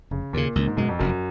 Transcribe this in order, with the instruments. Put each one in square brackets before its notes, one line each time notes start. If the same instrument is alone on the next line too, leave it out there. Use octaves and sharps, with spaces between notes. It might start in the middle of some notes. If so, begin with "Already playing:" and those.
[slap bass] F1 [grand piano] C#3
[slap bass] D#2 C#3 [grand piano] A#2
[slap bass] C#2 [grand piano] A#2
[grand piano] G#2
[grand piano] F#2 [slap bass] B2 G#3
[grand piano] F2
[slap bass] F1 [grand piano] F#2